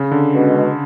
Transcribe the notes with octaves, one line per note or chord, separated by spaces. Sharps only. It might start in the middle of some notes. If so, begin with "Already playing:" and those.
Already playing: C#3
D3
B2 G#3 C#4